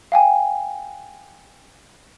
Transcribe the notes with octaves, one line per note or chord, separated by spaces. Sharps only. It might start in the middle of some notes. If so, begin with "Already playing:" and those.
F5 G5 G#5